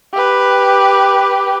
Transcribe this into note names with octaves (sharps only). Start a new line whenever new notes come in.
G4 B4